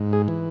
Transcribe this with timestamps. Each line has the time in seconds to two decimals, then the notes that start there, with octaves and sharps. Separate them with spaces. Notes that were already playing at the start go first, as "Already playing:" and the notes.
Already playing: G#2
0.13 G#4
0.28 E3